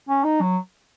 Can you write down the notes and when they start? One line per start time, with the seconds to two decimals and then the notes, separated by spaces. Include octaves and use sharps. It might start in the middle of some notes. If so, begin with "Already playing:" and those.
0.09 C#4
0.24 D#4
0.41 F#3